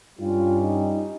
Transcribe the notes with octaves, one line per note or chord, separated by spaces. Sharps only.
G2 G3 C#4 F4
D#4